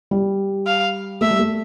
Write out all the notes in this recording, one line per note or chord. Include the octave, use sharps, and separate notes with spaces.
G3
F5
A3 E5
G3
A3